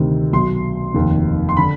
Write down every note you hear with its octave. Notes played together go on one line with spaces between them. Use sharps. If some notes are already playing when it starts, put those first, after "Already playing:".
Already playing: D2 C3 D#3
B1 B2 C6
F1 D#2 D#3
C6
D3 B5